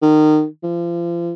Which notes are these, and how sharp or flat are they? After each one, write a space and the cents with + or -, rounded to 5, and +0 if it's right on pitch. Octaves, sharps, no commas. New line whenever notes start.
D#3 -25
F3 -35